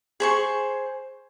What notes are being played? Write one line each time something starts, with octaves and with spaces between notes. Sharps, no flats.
G#4 C5 C#6